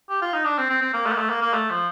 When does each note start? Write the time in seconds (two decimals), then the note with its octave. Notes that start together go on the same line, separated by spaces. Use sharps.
0.10 G4
0.22 F4
0.34 D#4
0.45 D4
0.58 C4
0.70 C4
0.82 C4
0.94 A#3
1.06 A3
1.12 A#3
1.18 A3
1.30 A#3
1.42 A#3
1.54 A3
1.70 F3